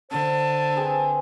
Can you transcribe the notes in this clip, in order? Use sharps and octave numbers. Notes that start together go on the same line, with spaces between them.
D3 C5 A5
C4 G#4 B4